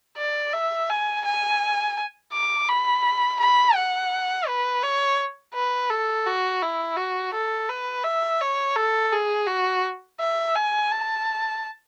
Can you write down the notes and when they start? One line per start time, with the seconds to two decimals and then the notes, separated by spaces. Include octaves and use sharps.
0.17 D5
0.53 E5
0.90 G#5
1.25 G#5
2.33 D6
2.68 B5
3.40 B5
3.75 F#5
4.47 B4
4.83 C#5
5.54 B4
5.90 A4
6.26 F#4
6.62 E4
6.97 F#4
7.34 A4
7.69 B4
8.04 E5
8.41 C#5
8.76 A4
9.12 G#4
9.47 F#4
10.20 E5
10.55 G#5
10.91 A5